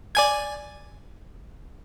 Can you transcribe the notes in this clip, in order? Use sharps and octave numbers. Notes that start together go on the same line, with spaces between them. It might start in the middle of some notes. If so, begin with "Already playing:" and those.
D5 G#5 G#6